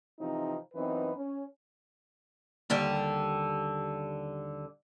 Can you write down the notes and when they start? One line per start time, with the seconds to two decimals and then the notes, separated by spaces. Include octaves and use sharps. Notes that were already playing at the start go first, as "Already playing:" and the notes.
0.20 C3 E3 F3 C4 D#4
0.74 F#2 E3 B3 C4 D#4 B4
1.16 C#4
2.70 D#2 D3 G3